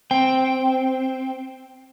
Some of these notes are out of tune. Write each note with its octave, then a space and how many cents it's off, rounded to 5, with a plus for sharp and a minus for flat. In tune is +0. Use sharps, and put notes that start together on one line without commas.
C4 +0 G5 +0